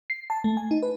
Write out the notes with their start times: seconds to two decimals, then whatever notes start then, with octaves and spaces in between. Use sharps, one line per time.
0.10 C7
0.30 A5
0.44 A3
0.57 G#5
0.71 D#4
0.83 B4